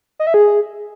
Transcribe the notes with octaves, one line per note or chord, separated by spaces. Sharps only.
D#5
E5
G#4